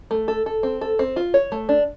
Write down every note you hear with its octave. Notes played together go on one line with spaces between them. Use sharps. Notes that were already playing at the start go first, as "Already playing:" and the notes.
A3
A4
A4
C4
A4
C4
F4
C#5
A3
D4